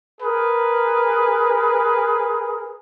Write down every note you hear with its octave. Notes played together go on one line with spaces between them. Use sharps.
G#4 A#4 B4